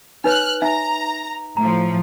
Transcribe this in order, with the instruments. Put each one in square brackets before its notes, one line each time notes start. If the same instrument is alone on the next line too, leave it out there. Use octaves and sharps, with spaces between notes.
[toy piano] D#4 B4 C#5 [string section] F6 F#6
[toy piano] D#4 E5 [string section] A#5
[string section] A2 F3 [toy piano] A#5